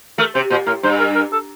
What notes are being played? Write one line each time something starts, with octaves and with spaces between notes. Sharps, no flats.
A3 A#4
C3 C5
A#2 C5
A2 A#4
G2 C5
A#4
A#4
A4